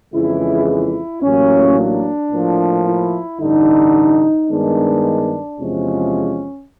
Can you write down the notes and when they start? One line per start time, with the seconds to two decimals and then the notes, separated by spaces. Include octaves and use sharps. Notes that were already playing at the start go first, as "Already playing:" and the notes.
0.14 F2 C#3 E3 G#3 E4
0.68 E4
1.23 A1 A2 F#3 A#3 C#4
1.77 D4
2.32 A2 F3 A#3
2.86 E4
3.41 A1 G2 D3 D#4
4.50 G2 D#3 G#3 B3 D4
5.59 E2 C3 F3 G#3 C#4